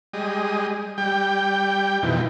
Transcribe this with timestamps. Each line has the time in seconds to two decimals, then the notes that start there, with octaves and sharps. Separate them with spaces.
0.13 G3 G#3 D#5
0.98 G3 G5
2.03 F2 B2 D#3 E3